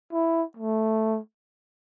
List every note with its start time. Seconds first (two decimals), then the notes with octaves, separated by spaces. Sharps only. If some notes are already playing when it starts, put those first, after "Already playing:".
0.13 E4
0.57 A3